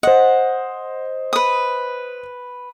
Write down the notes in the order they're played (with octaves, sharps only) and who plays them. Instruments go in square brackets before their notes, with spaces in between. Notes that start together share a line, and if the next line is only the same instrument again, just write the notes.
[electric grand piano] C5 D#5 [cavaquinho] F#5
[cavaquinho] B4 D#6